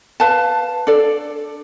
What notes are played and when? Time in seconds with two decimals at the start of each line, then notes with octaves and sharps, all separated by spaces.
0.20 B4 F5 A5
0.87 D4 A4 D5